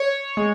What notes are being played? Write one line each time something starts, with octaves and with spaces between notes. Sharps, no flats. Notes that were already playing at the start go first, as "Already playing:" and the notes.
Already playing: C#5
G#3